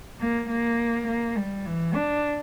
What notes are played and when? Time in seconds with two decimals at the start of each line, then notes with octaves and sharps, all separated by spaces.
0.20 A#3
0.49 A#3
1.08 A#3
1.37 G3
1.66 E3
1.95 D4